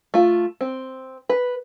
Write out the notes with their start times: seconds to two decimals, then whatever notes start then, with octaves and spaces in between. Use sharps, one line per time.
0.14 A3 F4
0.61 C4
1.29 B4